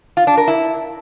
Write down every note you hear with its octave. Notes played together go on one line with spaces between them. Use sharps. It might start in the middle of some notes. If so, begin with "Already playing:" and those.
F4
D4
A#4
E4